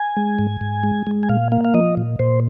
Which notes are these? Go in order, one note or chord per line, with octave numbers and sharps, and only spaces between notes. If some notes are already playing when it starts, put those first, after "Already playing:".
Already playing: G#5
G#3
G#2
G#2
G#3
G#3
G#5
A#2 F5
A#3 F5
F5
F3 D#5
A#2
A#2 C5